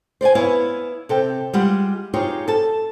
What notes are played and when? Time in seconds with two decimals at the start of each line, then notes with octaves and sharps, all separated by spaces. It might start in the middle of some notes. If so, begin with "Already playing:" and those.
0.21 C5 D5 F5 G#5
0.35 B3 E4 C#5 F5
1.09 C3 A4 G5
1.53 G3 G#3 F4 G4 D#5 F#5
2.14 D#4 F4 G4 G#4 C#5
2.48 A4 A5